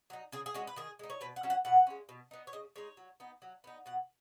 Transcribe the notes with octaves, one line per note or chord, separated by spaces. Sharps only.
F#3 D#4
C#3 G#4
G#4
G#3 C#4 F#4
B4
D#3 G#4
G#3 D#4
C#5
B2 B4
F#5
F#3 C#4
F#5
B2 F#5
G#3 C#4
B2
B3 D#4
C#5
C#3 D#5
G#3 D#4 C#5
F#3
B3 D#4
F#3
B3 D#4
B2 F#5